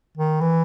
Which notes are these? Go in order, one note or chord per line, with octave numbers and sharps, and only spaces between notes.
D#3
E3